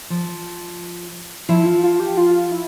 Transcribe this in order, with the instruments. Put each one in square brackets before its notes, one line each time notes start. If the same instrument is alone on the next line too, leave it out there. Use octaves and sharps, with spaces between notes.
[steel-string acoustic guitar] F3
[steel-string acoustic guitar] F3 [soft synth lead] E4
[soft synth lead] F4
F4
G4
F4
E4